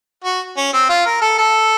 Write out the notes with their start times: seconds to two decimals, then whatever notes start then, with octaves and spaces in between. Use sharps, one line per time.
0.24 F#4
0.57 C#4
0.73 C4
0.89 F4
1.06 A#4
1.22 A4
1.38 A4